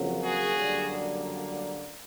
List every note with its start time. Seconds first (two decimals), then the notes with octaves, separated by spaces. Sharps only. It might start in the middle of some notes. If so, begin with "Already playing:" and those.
Already playing: F2 C#3 F#3 A#3
0.23 F#4 G#4
0.56 F#2 D3 G3 A#3